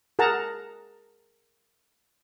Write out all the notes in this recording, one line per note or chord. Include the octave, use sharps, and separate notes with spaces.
G#4 A#4 F#5 A5 A#5